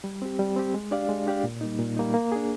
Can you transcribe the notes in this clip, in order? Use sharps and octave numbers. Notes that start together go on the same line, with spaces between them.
G3
C4 G4
G3
C4 G4
G#3
D4 G4 D5 F5
G#3
D4 G4 D5 F5
A#2
G3 A#3 D#4
A#2
G3 A#3 D#4
A#3
D4 G#4